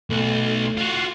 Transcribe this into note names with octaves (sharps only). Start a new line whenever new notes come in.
B1 A3
F4 F#4